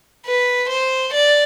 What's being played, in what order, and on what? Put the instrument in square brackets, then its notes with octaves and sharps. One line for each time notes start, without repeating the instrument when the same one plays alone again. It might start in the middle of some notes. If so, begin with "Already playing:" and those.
[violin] B4
C5
D5